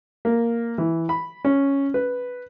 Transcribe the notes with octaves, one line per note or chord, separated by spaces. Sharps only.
A#3
E3
B5
C#4
B4